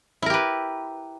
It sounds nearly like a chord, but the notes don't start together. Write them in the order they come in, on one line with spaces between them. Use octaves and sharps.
E4 A#4 G4 B4